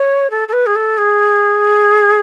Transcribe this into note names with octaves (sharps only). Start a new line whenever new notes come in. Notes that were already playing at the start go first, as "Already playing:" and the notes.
Already playing: C#5
A4
A4
B4
G#4
A4
G#4